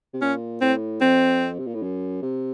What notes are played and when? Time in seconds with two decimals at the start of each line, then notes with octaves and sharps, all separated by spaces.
0.13 C3
0.21 A#2 C#4
0.61 A2 C4
1.01 F2 C4
1.59 C3
1.66 A#2
1.74 A2
1.82 F#2
2.22 C3